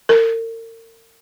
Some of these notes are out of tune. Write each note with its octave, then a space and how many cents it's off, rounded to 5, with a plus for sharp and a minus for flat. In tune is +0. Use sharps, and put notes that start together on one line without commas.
A#4 -40